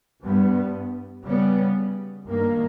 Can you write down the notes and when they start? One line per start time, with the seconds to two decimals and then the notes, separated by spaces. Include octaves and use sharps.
0.22 G2 G3 B3
1.24 C#3 G3 B3
2.26 G2 D#3 A#3